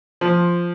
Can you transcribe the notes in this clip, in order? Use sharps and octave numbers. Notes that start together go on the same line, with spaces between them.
F3